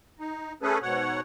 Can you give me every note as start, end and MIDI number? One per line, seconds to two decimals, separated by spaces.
0.19 0.53 63
0.62 0.78 57
0.62 0.78 61
0.62 0.78 68
0.62 0.78 69
0.62 0.78 71
0.82 1.20 44
0.82 1.20 47
0.82 1.20 73
0.82 1.20 78